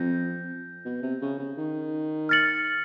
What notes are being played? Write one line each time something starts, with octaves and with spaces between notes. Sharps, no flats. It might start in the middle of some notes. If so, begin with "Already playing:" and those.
Already playing: F2 G6 A#6
B2
C3
C#3
C#3
D#3
F6 A6 C#7 F#7